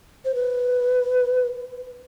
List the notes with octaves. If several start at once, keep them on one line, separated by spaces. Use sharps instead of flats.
C5
B4